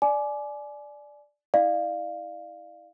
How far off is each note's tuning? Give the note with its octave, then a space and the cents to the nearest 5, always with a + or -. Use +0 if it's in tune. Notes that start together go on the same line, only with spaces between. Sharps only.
D5 +0 G#5 +30 D6 +0
E4 -25 D5 +35 F5 -5